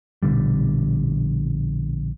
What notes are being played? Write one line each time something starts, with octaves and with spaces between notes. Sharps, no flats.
A#1 B2 D3 G3